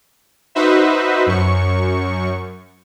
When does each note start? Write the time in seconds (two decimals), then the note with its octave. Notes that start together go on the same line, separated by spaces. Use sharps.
0.55 D#4 F#4 B4 C5 E5
1.27 F#2 C#6